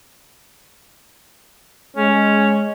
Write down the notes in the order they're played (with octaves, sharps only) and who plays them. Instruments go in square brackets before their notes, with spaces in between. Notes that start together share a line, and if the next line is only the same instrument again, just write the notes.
[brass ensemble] G#3 [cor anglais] C#4